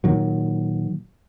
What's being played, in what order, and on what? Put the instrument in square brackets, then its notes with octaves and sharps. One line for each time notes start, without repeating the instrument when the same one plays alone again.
[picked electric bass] A#2 D#3 F#3